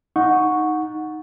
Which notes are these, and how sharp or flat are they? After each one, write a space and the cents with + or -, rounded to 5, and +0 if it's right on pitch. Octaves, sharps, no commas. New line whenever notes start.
D#4 +0 F#5 -15 C#6 +0